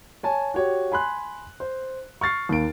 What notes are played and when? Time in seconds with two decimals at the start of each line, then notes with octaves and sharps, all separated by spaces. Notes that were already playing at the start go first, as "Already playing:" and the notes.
0.23 C#5 G#5 A5
0.54 F#4 G4 C#5
0.92 G#5 B5 C6 F#6
1.60 C5
2.21 C#6 F6 A6 C7
2.49 D#2 A#3 D7